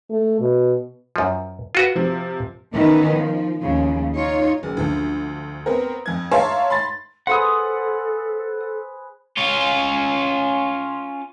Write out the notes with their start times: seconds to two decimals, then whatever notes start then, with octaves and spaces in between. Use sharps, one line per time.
0.10 A3
0.40 B2
1.16 F#2 F3
1.75 F4 F#4 B4
1.95 C3 F3
2.72 D#3 E3 B3 C#4 B4
3.13 F3
3.59 D#2 C#3 F3
4.14 D#4 F4 C#5
4.63 F#1
4.77 D2 D3 F3
5.66 B3 C4 A#4
6.06 F2 G#6
6.31 C#5 E5 F5 A5 A#5 C6
6.70 B5 C6 A6
7.27 G#4 A4 B4 C5 F#5 D#6
9.37 C#4 F4